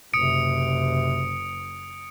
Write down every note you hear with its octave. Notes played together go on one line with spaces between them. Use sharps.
F#1 C3 D#6 C#7 D7